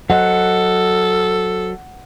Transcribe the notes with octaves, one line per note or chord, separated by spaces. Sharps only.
F#3 A4 C5 D#5 F#5